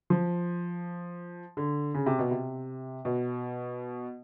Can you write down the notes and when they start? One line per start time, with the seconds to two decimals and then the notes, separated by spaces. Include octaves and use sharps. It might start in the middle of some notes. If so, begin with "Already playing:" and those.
0.10 F3
1.57 D3
1.94 C#3
2.06 C3
2.19 B2
2.31 C3
3.05 B2